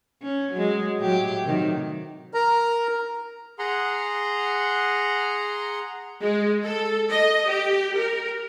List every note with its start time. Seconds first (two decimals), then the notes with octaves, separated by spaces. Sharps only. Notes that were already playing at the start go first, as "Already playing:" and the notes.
0.22 C#4
0.52 F#3 G#3
0.98 A2 F#3 G4
1.45 C3 D#3 F#3
2.34 A#4 A#5
3.59 G#4 F#5 A#5 C6
6.22 G#3
6.63 A4
7.10 D#5
7.46 G4
7.97 A#4